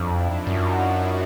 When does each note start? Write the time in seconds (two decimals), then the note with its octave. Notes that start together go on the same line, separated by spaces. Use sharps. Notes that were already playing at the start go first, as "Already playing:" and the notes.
Already playing: F2 D4 E4
0.16 D#4 F4
0.46 F#2 E4 F#4